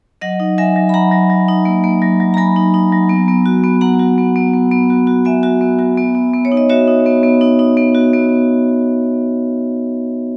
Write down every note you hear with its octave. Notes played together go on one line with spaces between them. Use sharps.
F#3 D#5 F#5
D#4
F#3 E5 G#5
F#3
B5
F#3 F#5 A#5
F#3
F#3
D#4
A#3
A#3
F#3
F#3
A#5
F#3 G#5 B5
D#4
D#4
F#3
B3
B3
F#4
B3
B3 F#5 A#5
F#4
B3
B3
B3
B3
F#4
F#4
B3 E5 G#5
F#4
B3
F#4
B3
B3
B3
C#5
D#4
D#5
F#4 C#5 E5
D#4
B3
B3
D#4
D#4
B3
F#4
B3